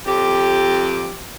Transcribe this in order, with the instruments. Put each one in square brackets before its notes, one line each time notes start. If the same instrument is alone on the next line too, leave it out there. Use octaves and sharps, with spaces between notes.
[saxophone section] F2 G4